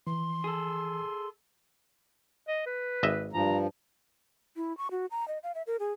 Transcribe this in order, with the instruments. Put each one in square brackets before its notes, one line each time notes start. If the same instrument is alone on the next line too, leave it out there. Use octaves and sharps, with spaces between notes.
[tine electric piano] E3 [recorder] C6
[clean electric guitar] G#4 A4
[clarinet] D#5
B4
[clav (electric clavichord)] G#1 D#5 E5
[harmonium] G2 F3 [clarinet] A#5
[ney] E4
C#6
F#4
A#5
D#5
F5
E5
A#4
G#4